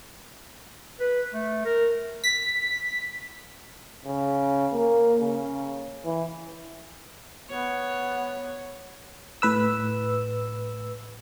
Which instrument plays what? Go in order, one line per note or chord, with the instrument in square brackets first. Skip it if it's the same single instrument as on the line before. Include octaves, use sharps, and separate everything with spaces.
[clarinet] B4
A3
A#4
[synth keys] B6
[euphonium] C#3
A#3
C#3
E3
[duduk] B3 [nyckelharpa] C#5
[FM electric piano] A2 B4 E6